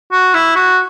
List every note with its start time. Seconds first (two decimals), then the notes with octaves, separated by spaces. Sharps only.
0.12 F#4
0.34 E4
0.56 F#4